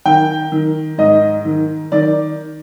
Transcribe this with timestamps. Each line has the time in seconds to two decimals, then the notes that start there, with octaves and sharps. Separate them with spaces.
0.05 D#3 G5
0.52 D#3
0.98 G#2 D#5
1.45 D#3
1.92 D#3 D5